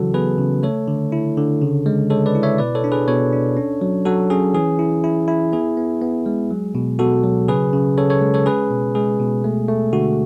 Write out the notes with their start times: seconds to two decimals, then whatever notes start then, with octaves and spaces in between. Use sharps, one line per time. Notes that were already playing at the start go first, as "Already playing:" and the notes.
Already playing: C#3 E3 F#3 F#4 A4
0.14 B3 G#4 B4
0.38 C#3
0.63 A3 A4 C#5
0.88 D3
1.12 E4
1.37 D3
1.62 C#3
1.86 G#3
2.10 G#3 A4 C#5
2.26 B4 D5
2.35 E4
2.43 C#5 E5
2.58 B2 B4 D5
2.75 A4 C#5
2.84 D4
2.92 G#4 B4
3.08 B2 A4 C#5
3.33 D4
3.57 C#4
3.81 F#3
4.05 F#3 F#4 A4
4.30 C#4 G#4
4.54 E3 G#4
4.79 E4
5.04 E4
5.28 E4
5.52 B3 G#4
5.77 B3
6.01 B3
6.26 G#3
6.51 F#3
6.75 B2
6.99 B2 F#4 A4
7.24 F#3
7.48 C#3 G#4 B4
7.73 C#3
7.97 C#3 A4 C#5
8.10 A4 C#5
8.21 G#3
8.34 A4 C#5
8.46 C#4 G#4 B4
8.70 B2
8.95 G#3 G#4
9.20 B2
9.44 A3
9.68 A3
9.93 D3 F#4